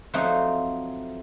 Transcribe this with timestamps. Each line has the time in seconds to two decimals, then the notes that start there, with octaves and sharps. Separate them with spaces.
0.14 F3 F#3 A3 C4 D#4